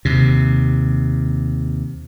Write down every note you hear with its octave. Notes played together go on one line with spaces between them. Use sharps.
D#2 C3